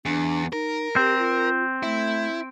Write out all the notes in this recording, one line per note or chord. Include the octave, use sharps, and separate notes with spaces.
E2 D4
D#4 A#4
C4 G4
F4
A3 E4